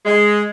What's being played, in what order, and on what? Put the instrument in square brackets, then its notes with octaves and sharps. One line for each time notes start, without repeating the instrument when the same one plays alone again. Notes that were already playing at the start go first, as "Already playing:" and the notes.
[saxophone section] G#3